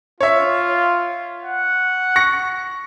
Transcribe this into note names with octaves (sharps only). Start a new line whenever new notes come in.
F4 C#5 E5
F#5
C#6 A#6 C#7